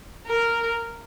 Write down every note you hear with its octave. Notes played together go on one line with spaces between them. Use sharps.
A#4